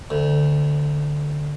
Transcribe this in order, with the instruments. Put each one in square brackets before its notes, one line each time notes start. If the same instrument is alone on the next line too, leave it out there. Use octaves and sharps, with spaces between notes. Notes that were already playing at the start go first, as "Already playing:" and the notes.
[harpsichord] D2